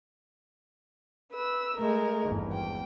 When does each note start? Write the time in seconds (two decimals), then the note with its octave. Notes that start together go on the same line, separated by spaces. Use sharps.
1.33 B4 E6
1.77 G#3 A3 A#4
2.21 G#1 E2 G2
2.52 G5